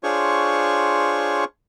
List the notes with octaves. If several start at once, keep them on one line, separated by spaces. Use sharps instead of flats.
D4 F4 G#4 C5 C#5 C#6